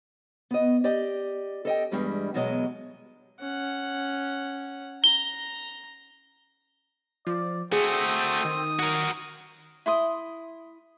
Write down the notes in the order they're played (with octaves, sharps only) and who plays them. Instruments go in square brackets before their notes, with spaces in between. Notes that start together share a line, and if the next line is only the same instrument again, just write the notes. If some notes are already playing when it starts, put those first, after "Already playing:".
[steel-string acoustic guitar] B3 D#5
G4 D5 D#5
A4 D#5 G5
E2 G2 G3 G#3
E2 B2 F#3 G#3 G4 D#5
[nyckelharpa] C#4 F#5
[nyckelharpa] A#5 [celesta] G7
[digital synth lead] F3 [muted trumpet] D5
[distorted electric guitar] A3 F#4 [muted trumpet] C4 [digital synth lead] G#4 [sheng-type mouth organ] D#6
[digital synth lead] G6
D#3
[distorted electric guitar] F#4 A#4
[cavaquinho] E4 C6 D#6